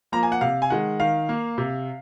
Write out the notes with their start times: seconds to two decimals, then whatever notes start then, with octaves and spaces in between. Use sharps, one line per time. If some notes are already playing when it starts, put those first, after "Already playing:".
0.12 F3 A#3 A#5
0.23 G#5
0.32 F#5
0.41 C3 F5
0.62 G#5
0.70 D#3 G#3 F#5
1.00 D#3 F5
1.29 A#3
1.58 C3